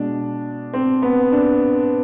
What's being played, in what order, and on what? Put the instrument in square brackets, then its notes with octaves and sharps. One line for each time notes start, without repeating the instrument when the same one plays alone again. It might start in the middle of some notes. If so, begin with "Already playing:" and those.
Already playing: [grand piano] B2 G#3 D4
C4
B3
D4